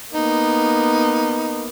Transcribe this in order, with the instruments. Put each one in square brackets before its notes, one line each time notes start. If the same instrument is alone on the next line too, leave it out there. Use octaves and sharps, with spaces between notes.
[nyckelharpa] A#3 B3 [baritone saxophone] D#4